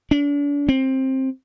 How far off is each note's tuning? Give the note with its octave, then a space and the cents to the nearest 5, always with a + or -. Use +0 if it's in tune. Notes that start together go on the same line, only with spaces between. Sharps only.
D4 -40
C4 +15